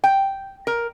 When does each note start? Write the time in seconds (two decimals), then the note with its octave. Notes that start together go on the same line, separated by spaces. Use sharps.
0.04 G5
0.67 A#4